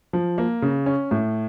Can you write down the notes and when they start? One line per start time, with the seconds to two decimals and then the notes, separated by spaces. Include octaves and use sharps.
0.13 F3
0.38 A#3
0.62 C#3
0.86 C#4
1.11 A2